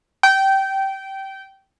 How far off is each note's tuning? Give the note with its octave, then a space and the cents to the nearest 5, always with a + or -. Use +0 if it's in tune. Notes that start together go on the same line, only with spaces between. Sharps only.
G5 -20